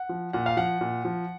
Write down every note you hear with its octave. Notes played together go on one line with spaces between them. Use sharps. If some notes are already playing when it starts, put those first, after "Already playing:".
Already playing: F#5
F3
A#2 F#5
F5
F3 F#5
A#2
F3